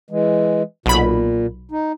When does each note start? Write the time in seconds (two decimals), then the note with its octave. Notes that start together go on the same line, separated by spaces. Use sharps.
0.10 E3 G#3
0.86 B1 A#2 B5
1.71 D#4